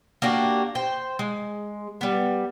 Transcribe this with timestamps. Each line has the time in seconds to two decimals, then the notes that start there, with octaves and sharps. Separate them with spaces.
0.22 A#3 D4 F#4 G4
0.75 C5 G5
1.19 G#3
2.01 G3 B3